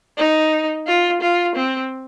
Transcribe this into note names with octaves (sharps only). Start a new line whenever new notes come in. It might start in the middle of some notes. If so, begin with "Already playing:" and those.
D#4
F4
F4
C4